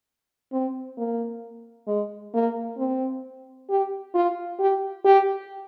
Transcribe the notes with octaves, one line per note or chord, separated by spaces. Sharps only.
C4
A#3
G#3
A#3
C4
G4
F4
G4
G4